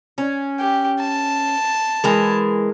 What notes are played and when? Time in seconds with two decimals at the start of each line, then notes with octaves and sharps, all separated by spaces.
0.18 C#4
0.60 G4
1.01 A5
2.04 E3 G#3 A#4